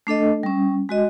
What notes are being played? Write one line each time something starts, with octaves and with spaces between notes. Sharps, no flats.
A3 D4 A4 D#5
G3 C#4
G#3 F#4 D#5